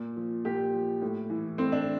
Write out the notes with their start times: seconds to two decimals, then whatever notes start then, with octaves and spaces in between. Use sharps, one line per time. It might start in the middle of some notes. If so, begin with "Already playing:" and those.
Already playing: A#2
0.16 F3
0.45 A#2 G4
0.73 F3
1.01 A2
1.30 E3
1.58 A2 C4
1.72 D4